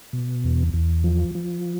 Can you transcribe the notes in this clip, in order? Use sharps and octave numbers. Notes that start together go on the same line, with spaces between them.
B2
E2
E2
F3
F3